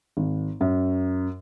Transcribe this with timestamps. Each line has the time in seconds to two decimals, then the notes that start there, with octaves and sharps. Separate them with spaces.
0.17 G#1
0.61 F#2